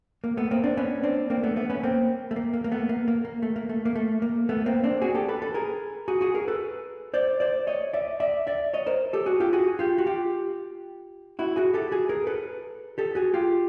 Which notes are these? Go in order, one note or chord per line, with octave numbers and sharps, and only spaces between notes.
A#3
A3 B3
A#3 C4
C4 D4
B3 C#4
C4 D4
A#3 C4
A3 B3
A3 B3
B3 C#4
A#3 C4
A3
A#3
A#3
A#3
A3 B3
A#3
A#3
A#3
A3
A#3
A3
A#3
A3
A#3
A3 B3
A#3 C4
C4 D4
F#4 G#4
G4 A4
A4 B4
A4 B4
G#4 A#4
F#4 G#4
F#4 G#4
G#4 A#4
A4 B4
C5 D5
C5 D5
C#5 D#5
D5 E5
D5 E5
D5 E5
C#5 D#5
A#4 C5
G4 A4
F#4 G#4
F4 G4
F#4 G#4
F4 G4
F#4
F4 G4
E4 F#4
F#4 G#4
G4 A4
F#4 G#4
G#4 A#4
A4 B4
G4 A4
F#4 G#4
F4 G4